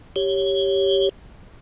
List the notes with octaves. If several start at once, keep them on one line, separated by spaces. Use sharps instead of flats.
G4 C#5